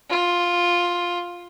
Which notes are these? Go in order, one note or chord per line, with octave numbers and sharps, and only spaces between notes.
F4